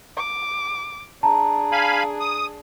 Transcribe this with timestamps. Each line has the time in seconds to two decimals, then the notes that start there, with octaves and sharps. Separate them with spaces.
0.17 D6
1.23 D4 G#4 A5 A#5
1.72 F5 G#5 B5
2.20 D#6